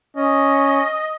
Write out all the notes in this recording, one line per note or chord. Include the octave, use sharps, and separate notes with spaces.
C#4 D#5